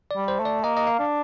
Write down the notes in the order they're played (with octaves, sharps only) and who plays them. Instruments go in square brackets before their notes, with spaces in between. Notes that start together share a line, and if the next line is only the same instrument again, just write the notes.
[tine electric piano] D5
[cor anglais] G3
[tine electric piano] C5
[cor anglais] A3
[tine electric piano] D5
[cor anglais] A#3 [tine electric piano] D#5
[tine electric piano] D#5
F5
[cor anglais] D4